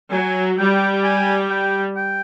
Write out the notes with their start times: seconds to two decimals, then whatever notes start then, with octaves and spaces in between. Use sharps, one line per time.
0.11 F#3 G#5
0.58 G3 G5
1.03 G#5
1.50 G5
1.96 G5